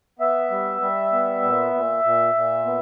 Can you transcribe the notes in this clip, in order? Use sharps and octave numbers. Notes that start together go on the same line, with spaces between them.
B3 E5
G3
G3
B3
A#2
A#2
A#2
A#2
B3